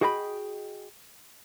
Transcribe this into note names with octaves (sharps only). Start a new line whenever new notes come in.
F#4 G#4 D#5 G5 A5 B5